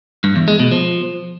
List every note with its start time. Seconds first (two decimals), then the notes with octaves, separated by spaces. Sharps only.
0.24 G2
0.36 E2
0.48 G#3
0.60 B2
0.71 F3